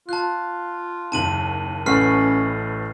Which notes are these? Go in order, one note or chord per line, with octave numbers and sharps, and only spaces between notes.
F4 A5 F#6
F#1 D#2 D#3 A5 D#7 F#7
A1 A3 C#4 B4 F#5 B5 F6 C7